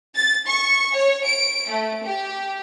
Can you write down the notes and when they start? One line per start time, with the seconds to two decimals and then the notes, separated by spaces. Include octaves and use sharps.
0.15 A6
0.47 C#6
0.94 C#5
1.24 D7
1.70 A3
2.04 G4